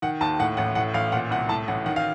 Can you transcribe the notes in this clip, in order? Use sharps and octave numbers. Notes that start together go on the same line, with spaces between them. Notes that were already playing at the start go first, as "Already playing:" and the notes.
D#3 F#5
D#2 A5
A2 F#5
A1 F#5
A2 F#5
A1 F5
A#2 F#5
C2 F#5
A2 A5
A1 F#5
D#3 F#5
F5